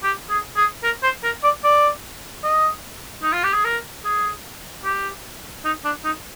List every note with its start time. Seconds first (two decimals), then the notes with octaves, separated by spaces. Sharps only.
0.03 G4
0.30 G#4
0.57 G#4
0.84 A#4
1.03 C5
1.24 A#4
1.44 D5
1.64 D5
2.44 D#5
3.22 D#4
3.32 F4
3.44 G4
3.53 G#4
3.64 A#4
4.04 G#4
4.84 G4
5.65 D#4
5.85 D4
6.04 D#4